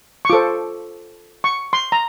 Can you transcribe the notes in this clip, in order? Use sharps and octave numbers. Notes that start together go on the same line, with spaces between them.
C#6
F4 A4 C5 D6
C#6
C6
A#5